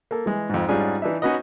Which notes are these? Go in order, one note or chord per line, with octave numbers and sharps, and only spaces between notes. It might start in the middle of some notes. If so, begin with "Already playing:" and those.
A#3 A4
E3 G#3
F2 G#2
G#2 G3 C#4 D4 F4 G#4
E3 D4 D#4 E5
B3 C#4 D#4 F#4 B4 D#5